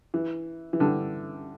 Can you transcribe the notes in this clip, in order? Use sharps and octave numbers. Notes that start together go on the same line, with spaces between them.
E3
E3
D3 G3